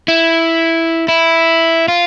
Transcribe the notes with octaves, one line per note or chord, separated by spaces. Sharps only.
E4
E4
F4